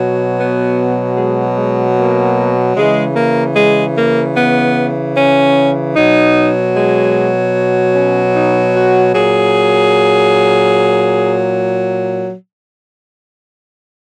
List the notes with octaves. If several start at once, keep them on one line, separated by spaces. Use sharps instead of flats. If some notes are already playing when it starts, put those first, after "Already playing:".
Already playing: B2 F#3
B3
G#3
G#3
A#3
C#3 E3 G#3
A#3
G#3
A#3
B3
C#4
B2 F#3 D#4
G#3
C#4
D#4
F#4
A#2 F#3 G#4